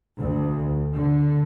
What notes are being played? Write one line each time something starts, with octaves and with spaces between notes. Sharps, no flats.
D2
D3